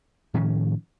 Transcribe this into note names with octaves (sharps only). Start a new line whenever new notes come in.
A2 D#3 F3 C#4